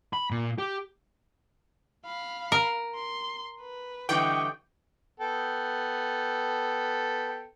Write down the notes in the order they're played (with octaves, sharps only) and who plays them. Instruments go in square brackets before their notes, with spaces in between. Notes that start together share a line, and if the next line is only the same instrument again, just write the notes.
[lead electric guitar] B5
A#2
G4
[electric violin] F5 B5
[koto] A#4
[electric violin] C6
B4
[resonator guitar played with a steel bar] D3 E3 G3 [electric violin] D#5 C#6 [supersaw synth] G5
[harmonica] B3 A4 G5